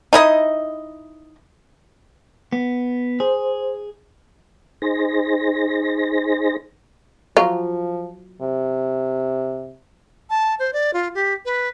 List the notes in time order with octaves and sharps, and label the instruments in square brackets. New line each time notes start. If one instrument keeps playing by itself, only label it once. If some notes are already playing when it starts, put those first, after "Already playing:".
[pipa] D#4 E4 D#5
[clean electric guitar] B3
[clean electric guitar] G#4 [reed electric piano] C5
[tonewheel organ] D#4 G#4 C5 A#6
[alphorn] F3 [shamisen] F#3 F4
[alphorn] C3
[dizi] A5
C5
D5
F4
G4
B4